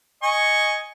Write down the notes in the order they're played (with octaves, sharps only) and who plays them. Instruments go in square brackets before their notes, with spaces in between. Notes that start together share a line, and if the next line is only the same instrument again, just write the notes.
[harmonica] D#5 G#5 C#6